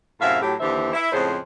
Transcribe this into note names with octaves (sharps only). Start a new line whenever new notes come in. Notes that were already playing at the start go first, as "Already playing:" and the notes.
F#2 A2 C3 E5 F5
A2 F#3 G4
D#2 D3 E3 G4 C5 E5
E4
F2 A2 C#3 G#3 C5